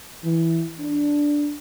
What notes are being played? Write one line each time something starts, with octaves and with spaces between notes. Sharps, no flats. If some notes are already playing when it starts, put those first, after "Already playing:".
E3
D4